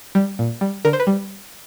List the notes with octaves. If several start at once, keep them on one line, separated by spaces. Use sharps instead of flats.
G3
A#2
G3
D3 A#4
C5
B4
G3